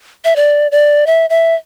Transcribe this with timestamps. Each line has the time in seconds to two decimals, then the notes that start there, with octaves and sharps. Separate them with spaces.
0.25 E5
0.36 D5
0.72 D5
1.07 E5
1.30 E5